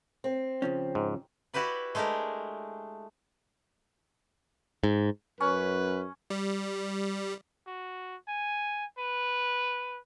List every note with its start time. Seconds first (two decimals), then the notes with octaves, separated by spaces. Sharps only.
0.24 C4
0.62 C#3 F3 C#4
0.95 G#2
1.54 E4 F#4 G4 B4 D5
1.95 G#3 A3 D4 G4 A#4
4.84 G#2
5.40 F#2 C#4 B4
6.30 G3
7.67 F#4
8.28 G#5
8.99 B4